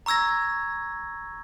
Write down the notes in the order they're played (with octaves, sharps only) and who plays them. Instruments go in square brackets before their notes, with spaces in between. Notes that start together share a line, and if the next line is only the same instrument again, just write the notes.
[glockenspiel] A#5 C#6 E6 G#6 A#6